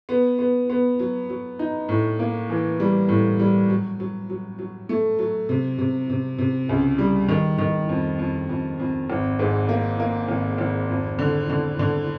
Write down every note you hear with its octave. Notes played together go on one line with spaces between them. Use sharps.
B3
B3
B3
F#3
F#3
D#4
A2
A#3
E3
G3
A2
G3
F#3
F#3
F#3
F#3
A3
F#3
C3
C3
C3
C3
C#2
G3
D#3
D#3
F2
F2
F2
F2
G#1
G#2
A#3
A#3
G#1
G#1
F2
D3
D3
D3